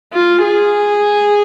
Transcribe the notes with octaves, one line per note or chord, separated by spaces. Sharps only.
F4
G#4